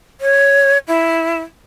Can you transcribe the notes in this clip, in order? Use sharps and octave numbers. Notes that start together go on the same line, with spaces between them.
C#5
E4